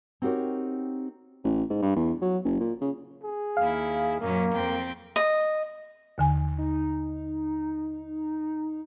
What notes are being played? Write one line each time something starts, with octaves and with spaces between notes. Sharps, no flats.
C4 D#4 F#4 G4 A#4 C#5
A1
G#2
G2
E2
F#3
F#1
A#2
C#3
G#4
D#2 E4 F5
F#2 A#2 A#3 C#4
F2 C4 G5
D#5
D#2 D3 G#5
D#4